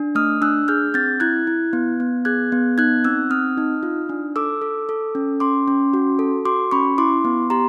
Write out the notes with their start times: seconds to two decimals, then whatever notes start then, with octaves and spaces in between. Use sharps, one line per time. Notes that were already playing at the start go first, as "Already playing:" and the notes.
Already playing: D4
0.15 A3 D#6 F6
0.41 D4 E6 F#6
0.68 G#4 F6 G6
0.94 C4 G6 A6
1.20 E4 F#6 G#6
1.47 E4
1.73 B3
2.00 B3
2.25 G#4 F#6 G#6
2.52 B3
2.78 D#4 F#6 G#6
3.05 C4 E6 F#6
3.30 C4 D#6 F6
3.58 D#4
3.83 F4
4.09 D4
4.36 A4 D6 E6
4.62 A4
4.89 A4
5.15 C#4
5.40 C#4 C6 D6
5.68 C#4
5.93 F#4
6.19 A4
6.45 F#4 C6 D6
6.71 C#4 B5 C#6
6.98 E4 C6 D6
7.25 B3
7.50 G4 A#5 C6